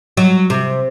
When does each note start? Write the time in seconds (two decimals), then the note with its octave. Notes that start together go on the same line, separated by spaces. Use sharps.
0.17 F#3
0.50 C3